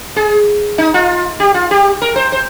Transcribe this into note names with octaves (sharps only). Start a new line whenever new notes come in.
G#4
D#4
F4
G4
F4
G4
A#4
C5
C5